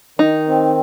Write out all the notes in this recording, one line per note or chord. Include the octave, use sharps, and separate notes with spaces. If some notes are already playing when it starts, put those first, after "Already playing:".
D#3 D#4
C4